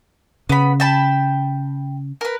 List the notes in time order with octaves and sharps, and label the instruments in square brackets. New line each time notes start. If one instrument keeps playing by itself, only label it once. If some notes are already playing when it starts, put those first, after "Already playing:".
[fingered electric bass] C#3 [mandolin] B3 B5
[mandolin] G5 A5 B5
A#4 B4